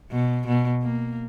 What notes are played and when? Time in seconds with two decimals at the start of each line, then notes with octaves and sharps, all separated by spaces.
0.12 B2
0.47 B2
0.82 A#3